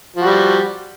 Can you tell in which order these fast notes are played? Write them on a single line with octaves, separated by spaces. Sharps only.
F3 F#4 G3